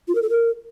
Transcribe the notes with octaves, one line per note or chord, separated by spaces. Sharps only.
F4
A#4
A4
A#4